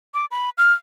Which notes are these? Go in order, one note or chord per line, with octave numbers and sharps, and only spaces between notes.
D6
B5
F6